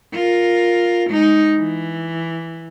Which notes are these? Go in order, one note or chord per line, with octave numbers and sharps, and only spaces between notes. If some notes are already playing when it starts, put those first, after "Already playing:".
F4 A#4
G#3 D#4
E3